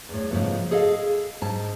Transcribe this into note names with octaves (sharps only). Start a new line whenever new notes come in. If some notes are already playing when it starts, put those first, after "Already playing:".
E2 A2
G#2 C#3 F3 A3 B3
G#4 A4 D#5 F5
G#2 A5